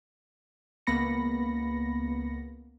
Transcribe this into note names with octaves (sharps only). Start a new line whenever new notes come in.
C#2 A#3 B3 B5 A#6 C#7